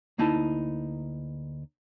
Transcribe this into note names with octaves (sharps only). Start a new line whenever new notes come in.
D2 A#3 D#4 E4 A5